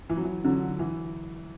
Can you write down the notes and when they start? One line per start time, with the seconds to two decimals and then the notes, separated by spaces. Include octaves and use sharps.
0.09 E3
0.17 F#3
0.24 E3
0.44 D3 F#3
0.79 E3